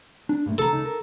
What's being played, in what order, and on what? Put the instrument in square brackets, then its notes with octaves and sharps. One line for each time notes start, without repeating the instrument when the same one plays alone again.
[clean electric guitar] D4
G2 A#2 A3
[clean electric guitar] C2 D3 A#5 [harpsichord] A4
[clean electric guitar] C#2 C#3 D#4
A#4